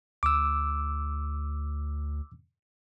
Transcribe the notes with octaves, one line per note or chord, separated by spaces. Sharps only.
D2 D6 E6